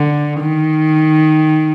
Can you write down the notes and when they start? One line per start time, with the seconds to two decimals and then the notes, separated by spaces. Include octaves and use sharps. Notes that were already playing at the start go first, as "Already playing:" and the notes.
Already playing: D3
0.40 D#3